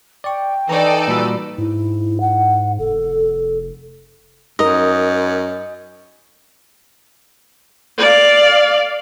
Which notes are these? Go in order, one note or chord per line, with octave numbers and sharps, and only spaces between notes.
D5 G5 C#6
E3 D#4 A4 D5 A#5 C#6
A#2 G3 F#4 B5 E6
G#2 E4
F#5
F1 A4
F#2 D#4 A#4 D#5
D5 F5